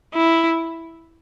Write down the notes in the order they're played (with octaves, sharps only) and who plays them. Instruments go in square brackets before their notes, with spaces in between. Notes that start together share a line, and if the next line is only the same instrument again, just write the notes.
[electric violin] E4